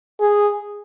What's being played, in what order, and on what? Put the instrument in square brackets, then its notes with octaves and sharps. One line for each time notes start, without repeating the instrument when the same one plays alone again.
[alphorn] G#4